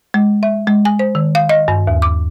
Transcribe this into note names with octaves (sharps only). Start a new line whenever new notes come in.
G#3
E5
G#3
G#5
C5
D#3
F5
D#5
G2
D#2
D6